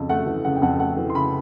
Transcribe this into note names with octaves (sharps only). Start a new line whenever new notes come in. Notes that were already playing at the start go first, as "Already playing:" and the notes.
Already playing: F2 C#3
A3 F#5
E3
C#3 F#5
G5
F2 F#5
A3 F#5
E3
C6
C#3 B5